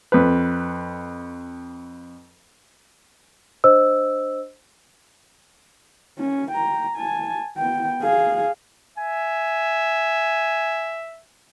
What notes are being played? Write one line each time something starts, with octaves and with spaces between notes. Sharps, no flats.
F2 B4
D4 C5 D#5 E6
C#4
G5 A#5
G#5 A5
B3 G5
G#4 F5
E5 G#5